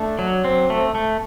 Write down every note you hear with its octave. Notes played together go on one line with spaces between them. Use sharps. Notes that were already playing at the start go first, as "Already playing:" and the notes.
Already playing: A3 D4
F#3
C4
A3
A3